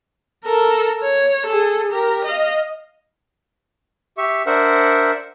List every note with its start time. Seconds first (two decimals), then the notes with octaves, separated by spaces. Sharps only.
0.44 A4 A#4
1.03 C#5
1.46 G#4 A4
1.92 G4 A#4
2.25 D#5 F5
4.18 G4 E5 C#6
4.46 D4 A#4 C5 E5 F#5